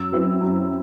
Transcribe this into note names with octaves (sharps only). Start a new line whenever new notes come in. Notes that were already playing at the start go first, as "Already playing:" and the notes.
Already playing: F#2 E6
F#3 C4 E4
F#2